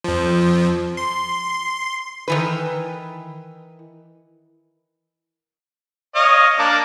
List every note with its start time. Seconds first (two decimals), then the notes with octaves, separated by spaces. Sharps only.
0.04 F2 F3
0.97 C6
2.28 D#3 E3 B4
6.15 C#5 D#5 F5
6.59 A#3 D4 D5